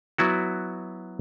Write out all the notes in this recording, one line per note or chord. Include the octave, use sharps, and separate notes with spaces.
F#3 B3 E4 F#4